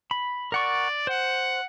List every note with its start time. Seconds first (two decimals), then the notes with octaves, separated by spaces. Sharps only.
0.11 B5
0.52 A#4 D5 F#5 C#6
1.07 C5 F#5